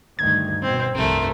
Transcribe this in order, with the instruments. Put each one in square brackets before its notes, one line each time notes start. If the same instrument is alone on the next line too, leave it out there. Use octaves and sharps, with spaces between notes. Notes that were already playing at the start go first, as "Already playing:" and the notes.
[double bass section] D2 G2 D#3 [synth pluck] G#6
[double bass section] B2 [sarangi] C4
[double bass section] F1 C2 G2 [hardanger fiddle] A3 C4 [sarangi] A#4